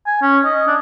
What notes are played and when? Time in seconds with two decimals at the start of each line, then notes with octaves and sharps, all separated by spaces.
0.07 G#5
0.22 C#4
0.45 D#5
0.67 D4